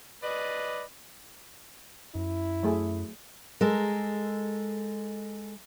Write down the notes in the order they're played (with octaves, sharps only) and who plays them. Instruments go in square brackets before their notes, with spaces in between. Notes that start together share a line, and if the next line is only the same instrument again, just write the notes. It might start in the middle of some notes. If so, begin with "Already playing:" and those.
[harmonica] B4 D5 D#5
[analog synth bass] F#2 [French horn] E4
[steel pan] F#3 A3 G#4
[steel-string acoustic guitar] G#3 A4 A#4